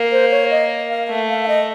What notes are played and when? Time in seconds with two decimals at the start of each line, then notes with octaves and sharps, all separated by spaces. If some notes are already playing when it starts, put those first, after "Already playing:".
Already playing: A#3
0.12 C5
0.31 C#5
0.50 D#5
0.90 F5
1.09 A3
1.29 F5
1.43 F5
1.48 D#5